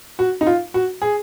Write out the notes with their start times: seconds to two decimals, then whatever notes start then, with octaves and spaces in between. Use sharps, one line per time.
0.19 F#4
0.41 D#4
0.47 F4
0.74 F#4
1.02 G#4